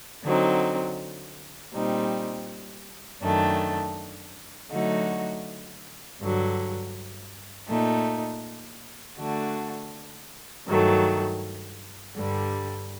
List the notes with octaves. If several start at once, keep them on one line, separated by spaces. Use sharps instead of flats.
D3 F#3 C4 D#4
A#2 G3 C4 D#4
F#2 D#3 A3 D4
D3 F#3 A3 D#4 F#4
G2 D3 F#3
A#2 A3 D#4
D3 A3 D4 F#4
G2 D#3 F#3 A3
G2 D3 G3